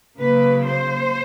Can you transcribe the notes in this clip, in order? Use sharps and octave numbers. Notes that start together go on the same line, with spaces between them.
C#3 F#3 A#3 B4
C5